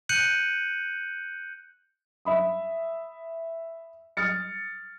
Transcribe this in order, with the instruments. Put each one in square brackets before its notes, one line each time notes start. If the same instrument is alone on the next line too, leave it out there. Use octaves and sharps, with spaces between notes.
[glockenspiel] F#6 G6 C#7 D#7 F#7
[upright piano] E5 B5 D#6
D#6 F6 A6 C#7